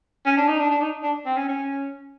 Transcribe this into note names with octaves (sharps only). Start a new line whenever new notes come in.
C#4
D4
D#4
D4
D4
D#4
D4
C4
C#4
C#4